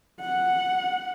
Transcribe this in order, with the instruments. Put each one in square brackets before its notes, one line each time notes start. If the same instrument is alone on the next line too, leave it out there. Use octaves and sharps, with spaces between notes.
[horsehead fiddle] F#5